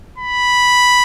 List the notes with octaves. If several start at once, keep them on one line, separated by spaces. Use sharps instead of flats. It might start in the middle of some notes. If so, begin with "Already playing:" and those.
B5